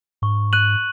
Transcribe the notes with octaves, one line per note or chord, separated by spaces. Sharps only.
G#2 C#6
F#6 D#7 F#7